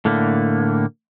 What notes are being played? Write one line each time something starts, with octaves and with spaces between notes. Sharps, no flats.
A2 D3 A3 A#3